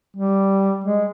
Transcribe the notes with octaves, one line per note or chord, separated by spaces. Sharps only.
G3
G#3